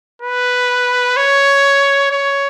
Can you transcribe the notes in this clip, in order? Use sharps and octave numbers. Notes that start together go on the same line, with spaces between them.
B4
C#5
C#5